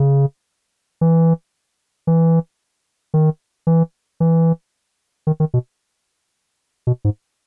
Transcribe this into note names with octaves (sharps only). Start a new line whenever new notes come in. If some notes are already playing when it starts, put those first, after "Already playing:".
Already playing: C#3
E3
E3
D#3
E3
E3
D#3
D#3
B2
B2
G#2